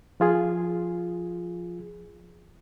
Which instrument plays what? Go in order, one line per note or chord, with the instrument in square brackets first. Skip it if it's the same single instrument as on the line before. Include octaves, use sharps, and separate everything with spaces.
[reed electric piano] F3 F4 G#4